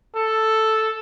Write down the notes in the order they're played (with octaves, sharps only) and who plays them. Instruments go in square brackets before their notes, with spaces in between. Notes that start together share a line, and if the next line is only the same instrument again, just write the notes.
[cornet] A4